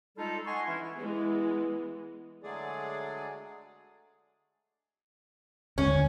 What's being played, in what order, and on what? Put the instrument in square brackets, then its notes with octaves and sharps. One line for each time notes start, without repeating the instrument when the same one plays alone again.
[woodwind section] G3 G#3 D#4 F4 A4
D#5 F#5 G#5 C6 C#6
E3 C#4 E4
[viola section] E3 G#3 B3
[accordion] D3 F#3 G#3 A3 G#4 D5
[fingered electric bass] D#2 D3 G#3 [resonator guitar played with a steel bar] C#4